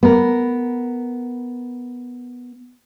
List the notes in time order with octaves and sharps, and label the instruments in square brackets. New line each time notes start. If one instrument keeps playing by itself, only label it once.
[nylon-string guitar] B3 A#4